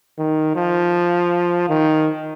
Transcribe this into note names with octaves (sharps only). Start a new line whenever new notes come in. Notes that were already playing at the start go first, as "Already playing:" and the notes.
D#3
F3
D#3